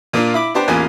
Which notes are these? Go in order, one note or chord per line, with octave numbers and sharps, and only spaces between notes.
A#2 A#3 D4 F4
E4 B5 D6
B3 D4 G4 C5
A1 E2 A#3 F4 G#5